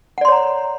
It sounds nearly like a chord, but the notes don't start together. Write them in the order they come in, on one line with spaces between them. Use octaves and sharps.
F#5 D5 C6 C#5 A#5